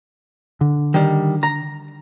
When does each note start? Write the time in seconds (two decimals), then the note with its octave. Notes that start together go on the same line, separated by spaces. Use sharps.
0.61 D3
0.94 D#3 G3
1.43 A#5